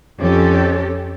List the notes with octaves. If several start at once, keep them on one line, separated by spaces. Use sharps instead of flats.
F2 C#4 G4 A4